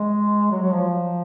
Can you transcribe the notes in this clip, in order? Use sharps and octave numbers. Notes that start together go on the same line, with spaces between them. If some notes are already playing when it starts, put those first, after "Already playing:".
Already playing: G#3
F#3
F#3
F3